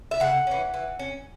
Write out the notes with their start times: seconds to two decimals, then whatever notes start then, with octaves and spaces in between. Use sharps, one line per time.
0.11 E5
0.20 C#3 F#5
0.47 E3 C#4
0.74 E3
0.99 C#4